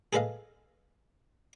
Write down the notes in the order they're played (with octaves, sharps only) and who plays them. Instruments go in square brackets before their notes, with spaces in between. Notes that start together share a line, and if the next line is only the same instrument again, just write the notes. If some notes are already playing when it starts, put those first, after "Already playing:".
[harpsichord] G#4 A4 B4 D#5 F5